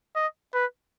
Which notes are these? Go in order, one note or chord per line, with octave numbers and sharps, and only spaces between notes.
D#5
B4